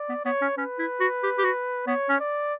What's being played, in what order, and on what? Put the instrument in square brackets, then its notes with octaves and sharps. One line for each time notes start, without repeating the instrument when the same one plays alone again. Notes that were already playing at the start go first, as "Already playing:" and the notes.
Already playing: [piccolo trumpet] D5
[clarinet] B3
[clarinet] B3 [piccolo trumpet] C#5
[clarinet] C#4
[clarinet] C#4 [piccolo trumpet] B4
[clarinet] E4
F#4
G4
G4
F#4
[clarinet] B3 [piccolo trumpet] C#5
[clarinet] C#4
[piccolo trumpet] D5